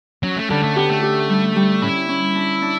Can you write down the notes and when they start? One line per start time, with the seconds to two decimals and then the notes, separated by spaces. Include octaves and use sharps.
0.23 F#3 C#4
0.37 A3
0.50 D3 G3
0.63 A3
0.76 B3 G4
0.90 A3
1.02 G4
1.29 G3
1.56 G3
1.82 C#4 E4
2.09 C#4
2.35 D4
2.62 D4